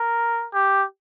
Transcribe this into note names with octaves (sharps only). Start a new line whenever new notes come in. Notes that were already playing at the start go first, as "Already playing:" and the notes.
Already playing: A#4
G4